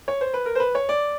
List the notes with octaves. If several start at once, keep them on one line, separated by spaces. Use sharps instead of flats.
C#5
C5
B4
A#4
C5
B4
C#5
D5